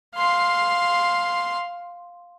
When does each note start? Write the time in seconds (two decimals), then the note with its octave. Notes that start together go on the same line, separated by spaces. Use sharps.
0.16 F5 C6